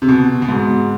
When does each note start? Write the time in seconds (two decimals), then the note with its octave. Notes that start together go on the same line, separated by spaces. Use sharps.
0.02 C3
0.09 B2
0.42 B2
0.48 G#2